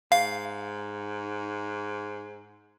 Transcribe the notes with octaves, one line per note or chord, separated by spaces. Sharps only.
G#2 F5